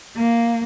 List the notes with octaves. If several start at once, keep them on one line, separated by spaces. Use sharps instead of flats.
A#3